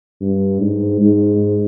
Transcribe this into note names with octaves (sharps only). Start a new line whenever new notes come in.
G2
G#2
G#2